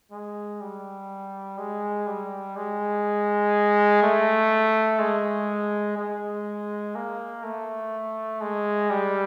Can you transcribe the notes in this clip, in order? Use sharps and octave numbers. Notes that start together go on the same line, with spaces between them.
G#3
G3
G#3
G3
G#3
A3
G#3
G#3
A#3
A3
G#3
G3